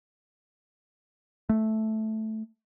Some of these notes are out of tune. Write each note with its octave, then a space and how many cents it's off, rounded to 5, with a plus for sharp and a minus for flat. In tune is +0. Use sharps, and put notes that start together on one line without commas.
A3 -5